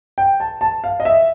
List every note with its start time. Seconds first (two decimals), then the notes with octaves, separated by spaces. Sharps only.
0.18 G5
0.40 A5
0.61 A5
0.84 F5
1.00 D#5
1.05 E5